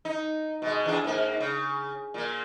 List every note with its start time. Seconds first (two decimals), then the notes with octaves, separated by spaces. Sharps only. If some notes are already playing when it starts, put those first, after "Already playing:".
0.05 D#4
0.62 B2 G#3
0.86 E2 D4 G#4
1.04 G#2 A#3
1.40 C#3
2.14 A#2 A#3